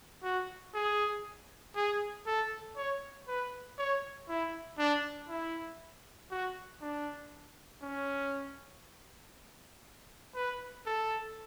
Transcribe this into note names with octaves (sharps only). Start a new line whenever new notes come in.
F#4
G#4
G#4
A4
C#5
B4
C#5
E4
D4
E4
F#4
D4
C#4
B4
A4